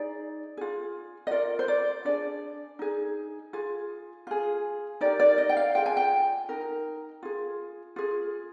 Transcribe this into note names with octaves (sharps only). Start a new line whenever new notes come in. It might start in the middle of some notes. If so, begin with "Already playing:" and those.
Already playing: D#4 G#4 D5
F4 G#4
D#5
F4 A#4 D5
C5
D5
D4 G#4 D5
D#4 G#4
F4 G#4
F4 G#4
D#4 G4 A#4 D5
D5
D#5
G5
F5
F4 G#4 G5
G#5
G5
D#4 A#4
F4 G#4
F4 G#4